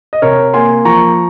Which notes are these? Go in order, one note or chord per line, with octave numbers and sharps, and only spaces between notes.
D#5
C3 A#4 C#5
A#3 G#5 C6
F3 A#5 C#6